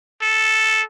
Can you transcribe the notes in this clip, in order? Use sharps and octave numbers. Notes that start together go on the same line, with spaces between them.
A4